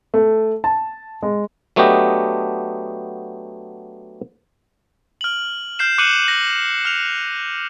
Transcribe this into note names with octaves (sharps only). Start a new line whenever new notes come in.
A3
A5
G#3
F#3 A3 B3 D4 G4 D#5
F6 F#7
F6 G6 C7 E7
D6 F#6 C#7 D#7 E7 F#7
A#6 F#7
F6 F7